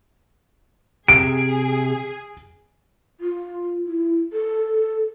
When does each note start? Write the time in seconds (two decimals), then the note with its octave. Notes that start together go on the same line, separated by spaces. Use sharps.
1.08 C3 G#4 D7
3.20 F4
3.86 E4
4.32 A4